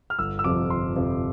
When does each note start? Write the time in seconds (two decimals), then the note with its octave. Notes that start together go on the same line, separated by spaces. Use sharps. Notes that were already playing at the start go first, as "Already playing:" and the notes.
0.10 F6
0.19 G1 E6
0.39 E6
0.44 F2 C3 F3 D6
0.70 G1 C6
0.96 F2 C3 F3